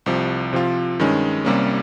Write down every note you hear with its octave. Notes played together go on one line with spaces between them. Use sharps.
C2 C3 F3
C3 F3 C4 F4
G2 D#3 G#3 C#4
C2 C3 G3 A#3 C#4